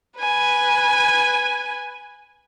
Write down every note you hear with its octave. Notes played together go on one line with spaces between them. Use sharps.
B4 G#5